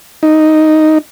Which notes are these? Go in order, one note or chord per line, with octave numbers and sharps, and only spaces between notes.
D#4